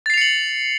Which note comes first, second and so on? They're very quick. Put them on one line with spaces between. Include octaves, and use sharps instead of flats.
A6 C7 F7 C#7 F#7